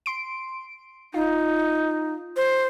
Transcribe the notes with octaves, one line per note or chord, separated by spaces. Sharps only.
C6 D7
D#4 F4
C5